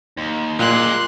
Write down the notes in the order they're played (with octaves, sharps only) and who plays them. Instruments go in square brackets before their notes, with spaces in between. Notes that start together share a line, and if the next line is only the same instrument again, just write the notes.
[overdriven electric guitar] D#2
[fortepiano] A#2 [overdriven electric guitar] G#3 G4 [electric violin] C6 F#6